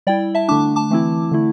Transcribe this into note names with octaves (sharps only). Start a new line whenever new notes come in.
G3 E4 D5 G5
E5 A5
D3 A3 D4 A5 D6
A5 D6
E3 A3 C4 E4
D3 A3 E4